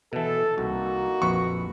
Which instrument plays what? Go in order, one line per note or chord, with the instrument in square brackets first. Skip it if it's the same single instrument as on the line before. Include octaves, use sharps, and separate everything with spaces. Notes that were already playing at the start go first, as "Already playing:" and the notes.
[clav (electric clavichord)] B2 E3 [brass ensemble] A4
[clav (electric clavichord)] C2 [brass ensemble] A#3 D#4 F#4
[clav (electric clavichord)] A#1 F2 B4 [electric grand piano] C#6